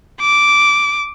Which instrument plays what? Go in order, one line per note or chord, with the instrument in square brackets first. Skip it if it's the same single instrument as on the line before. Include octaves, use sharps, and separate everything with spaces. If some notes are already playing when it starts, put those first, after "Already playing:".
[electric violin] D6